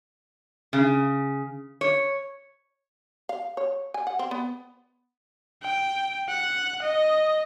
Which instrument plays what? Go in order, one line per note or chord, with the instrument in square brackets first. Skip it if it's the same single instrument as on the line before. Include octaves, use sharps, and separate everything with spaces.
[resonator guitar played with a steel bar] C#3
C#5
[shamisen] F5
C#5
G#5
F#5
C4
B3
[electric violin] G5
F#5
D#5